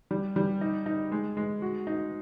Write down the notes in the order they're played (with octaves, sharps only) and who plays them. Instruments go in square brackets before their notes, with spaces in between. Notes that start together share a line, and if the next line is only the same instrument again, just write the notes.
[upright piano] G3
G3
D#4
D#4
G#3
G#3
F#4
D#4